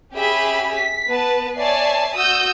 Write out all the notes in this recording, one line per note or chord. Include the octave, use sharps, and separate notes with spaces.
C#4 G4 G#4 E5 B5
B6
B3 B4 A5
C#5 D5 E5 G#5 A5 C7
F#4 D#6 E6 G6